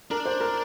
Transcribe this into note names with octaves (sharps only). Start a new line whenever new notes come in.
D4 A#4
C5
A#4